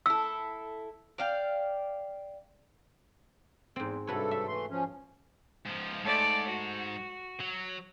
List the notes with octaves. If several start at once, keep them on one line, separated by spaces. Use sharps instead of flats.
E4 A4 E6
D5 F5 G5
E2 G#2 C4
G2 C3 F#4 A4 B4 C#5
E5
E3 A3 C6
F3 C#4
G#2 F3
G#2 A3 D5
F#4
F#3